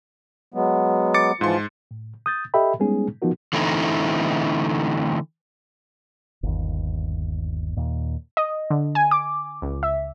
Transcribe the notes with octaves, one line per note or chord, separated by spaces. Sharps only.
F#3 G#3 B3
D6 A6 C#7
G#2 E3 F3 F4 C6
A2
D#6 G6 A6
G4 A4 D#5 E5 G5 B5
G3 G#3 B3 C#4 D#4 G#4
F3 B3 D#4 F4 F#4 A#4
D3 E3 A3 C4 D#4 E4
G1 D#2
D#2 A#2
D#5
D3
G#5
D6
C#2
E5